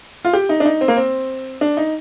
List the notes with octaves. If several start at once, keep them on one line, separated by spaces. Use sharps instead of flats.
F4
G4
D#4
D4
D#4
C4
A#3
C4
D4
D#4